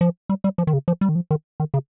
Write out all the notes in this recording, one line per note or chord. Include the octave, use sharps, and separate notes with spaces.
F3
G3
G3
F3
D#3
C#3
F3
G3
D#3
F3
D#3
D#3
C#3